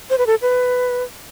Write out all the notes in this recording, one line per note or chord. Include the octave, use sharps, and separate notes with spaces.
C5
B4
A4
B4